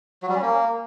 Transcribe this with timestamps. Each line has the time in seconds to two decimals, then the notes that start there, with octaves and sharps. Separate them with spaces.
0.22 F#3
0.29 G3
0.36 C#4
0.42 A#3